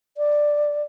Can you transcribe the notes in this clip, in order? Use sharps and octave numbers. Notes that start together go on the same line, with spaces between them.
D5